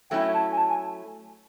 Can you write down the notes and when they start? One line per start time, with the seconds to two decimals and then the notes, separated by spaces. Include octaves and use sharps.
0.10 F#3 A3 C#4 E4 G5
0.34 A5
0.52 G#5
0.58 A5
0.70 G#5